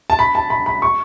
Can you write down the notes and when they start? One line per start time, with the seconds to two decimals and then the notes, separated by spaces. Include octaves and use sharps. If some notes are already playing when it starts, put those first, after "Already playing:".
0.10 A5
0.19 B5
0.35 A5
0.50 B5
0.66 B5
0.82 C#6